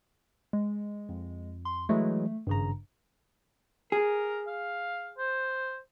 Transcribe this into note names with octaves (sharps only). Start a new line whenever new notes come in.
G#3
F2
C6
E3 F#3 G#3 A3
G#1 G2 C#3 A#5
G#4 A#4
F5
C5